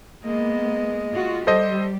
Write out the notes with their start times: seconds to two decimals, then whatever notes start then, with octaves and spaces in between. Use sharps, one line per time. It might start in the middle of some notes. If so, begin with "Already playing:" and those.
0.24 G#3 A#3 B3 D#5
1.11 F4 F#4
1.47 G3 G4 A4 C5 D#5